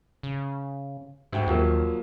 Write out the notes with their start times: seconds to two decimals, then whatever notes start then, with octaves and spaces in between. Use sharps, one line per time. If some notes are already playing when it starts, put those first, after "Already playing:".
0.23 C#3
1.32 D2 G#2 E5 G5
1.47 D#2 F3 F#3 A#3